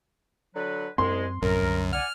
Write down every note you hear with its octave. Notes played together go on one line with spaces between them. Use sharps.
D3 F#3 B4
C2 F#2 G#3 C4 C6
A#1 F#2 A2 C3 A#4
C2 D3
D5 F#5 G#5 F6